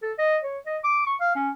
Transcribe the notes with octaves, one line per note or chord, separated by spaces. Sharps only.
A4
D#5
C#5
D#5
D6
C#6
F5
C#4